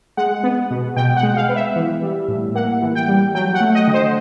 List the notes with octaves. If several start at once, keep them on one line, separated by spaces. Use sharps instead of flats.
G#3 F#5
B3
B2
B2 G5
F#5
G#3
F5
B3
E5
E3
G3
A2
A#3 F#5
E3
G5
G3
F#3 G5
F#5
A3
D#5
D3
C5